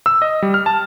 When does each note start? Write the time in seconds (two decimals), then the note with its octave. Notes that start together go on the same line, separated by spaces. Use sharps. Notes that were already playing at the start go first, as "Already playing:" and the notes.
0.06 E6
0.22 D#5
0.42 G3
0.54 F6
0.66 A5